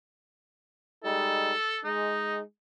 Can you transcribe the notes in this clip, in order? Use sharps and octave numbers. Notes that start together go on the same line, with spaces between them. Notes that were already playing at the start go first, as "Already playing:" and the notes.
G3 G#3 D#4 A4
G#3 D#4